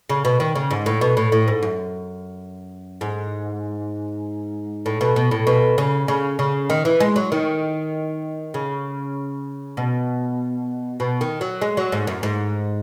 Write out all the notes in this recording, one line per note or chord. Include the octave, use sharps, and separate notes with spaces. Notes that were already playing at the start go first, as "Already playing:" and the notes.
C#3
B2
D#3
C#3
G#2
A2
B2
A2
A2
G#2
F#2
G#2
A2
B2
B2
A2
B2
C#3
C#3
C#3
D#3
E3
G#3
F#3
D#3
C#3
B2
B2
D#3
F#3
G#3
F#3
G#2
F#2
G#2